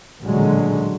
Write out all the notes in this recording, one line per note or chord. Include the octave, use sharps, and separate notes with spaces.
A1 D#2 A#2 D3 F#3 G#3